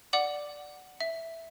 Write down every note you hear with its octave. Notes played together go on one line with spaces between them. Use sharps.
D5 F#5 D6 F#7
E5